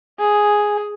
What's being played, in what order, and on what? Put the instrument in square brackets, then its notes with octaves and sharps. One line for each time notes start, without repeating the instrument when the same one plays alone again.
[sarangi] G#4